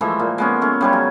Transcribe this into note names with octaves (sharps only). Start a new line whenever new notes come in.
E3 F3 G#3 A3
A#2
G#3 B3 C#4
A3 C#4
C#3 G3 G#3
F#3